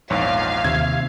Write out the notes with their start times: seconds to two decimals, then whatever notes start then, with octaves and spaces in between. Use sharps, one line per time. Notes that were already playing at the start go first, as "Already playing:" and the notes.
0.10 A#1 E2 G#2 C#5 F5
0.64 D#2 C3 E5 G#6